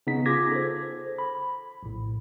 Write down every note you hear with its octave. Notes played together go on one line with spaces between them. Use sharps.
C#3 B3 D#4 B6
F4 G#4 D6 G#6 A#6 B6
A4 C5
B5
A#1 A2